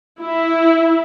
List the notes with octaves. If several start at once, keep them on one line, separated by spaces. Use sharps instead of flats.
E4